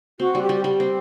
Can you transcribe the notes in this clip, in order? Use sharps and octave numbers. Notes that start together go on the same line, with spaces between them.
C4 F#4
G3
G4
G3
G3 G4
C4